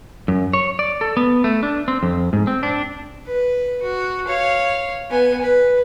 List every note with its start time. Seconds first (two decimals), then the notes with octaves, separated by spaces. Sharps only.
0.28 F#2
0.53 C#5
0.79 D5
1.01 A4
1.17 B3
1.44 A3
1.63 D4
1.88 C4
2.03 F2
2.33 G#2
2.47 C4
2.63 D4
3.26 B4
3.82 F#4
4.27 C#5 F5
5.10 B3 G#5
5.41 B4